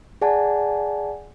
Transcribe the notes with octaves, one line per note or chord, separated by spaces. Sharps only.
G#4 D5 F#5 G#5 A5